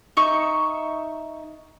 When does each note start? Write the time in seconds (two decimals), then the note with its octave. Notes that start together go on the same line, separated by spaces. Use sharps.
0.17 D#4 E5 C#6